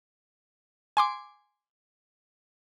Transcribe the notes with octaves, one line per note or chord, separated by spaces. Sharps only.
G#5 C6 D6